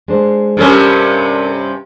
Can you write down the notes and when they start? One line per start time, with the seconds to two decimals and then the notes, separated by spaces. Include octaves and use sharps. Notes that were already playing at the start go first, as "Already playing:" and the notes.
0.08 G#3 D4 C5
0.57 G2 C3 C#4 D4 A4 A#4